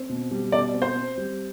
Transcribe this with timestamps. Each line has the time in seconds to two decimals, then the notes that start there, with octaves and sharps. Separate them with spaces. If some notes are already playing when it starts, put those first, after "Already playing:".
Already playing: C4
0.09 B2
0.31 G3
0.52 B2 D5
0.74 C4
0.82 C5
0.96 C4
1.18 G3